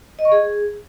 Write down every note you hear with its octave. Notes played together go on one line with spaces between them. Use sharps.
D#5
C#6
G#4